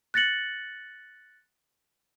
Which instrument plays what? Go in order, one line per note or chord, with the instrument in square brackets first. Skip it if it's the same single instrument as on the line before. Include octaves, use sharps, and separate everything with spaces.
[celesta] F#6 A6 A#6 C#7 F#7